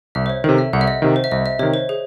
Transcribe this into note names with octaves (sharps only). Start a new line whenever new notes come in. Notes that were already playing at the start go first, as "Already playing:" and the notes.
C2 E5
C5
C#5
C3 D#3 A4
E5
C2 F#5
E5
D#5
C3 D#3
C5
E5
C2 D#5
E5
C3 D#3 C#5
C5
G#4